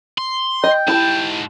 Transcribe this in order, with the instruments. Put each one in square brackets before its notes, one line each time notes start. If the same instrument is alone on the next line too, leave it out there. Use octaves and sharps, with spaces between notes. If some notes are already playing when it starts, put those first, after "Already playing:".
[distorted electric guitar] C6
[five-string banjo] D#5 [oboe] G5
[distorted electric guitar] G#2 A5 [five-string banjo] E4 G4